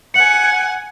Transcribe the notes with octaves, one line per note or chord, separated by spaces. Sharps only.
F#5 G#5 C#7 F#7